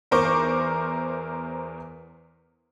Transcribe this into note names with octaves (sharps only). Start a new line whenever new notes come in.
E2 A#4 C5 C#6 D6